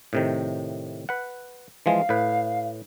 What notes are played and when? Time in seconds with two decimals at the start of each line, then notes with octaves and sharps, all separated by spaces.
0.13 A2 C3 D#3
1.09 B4 F#5
1.86 E3 F3 G#3 F5
2.09 A2 B4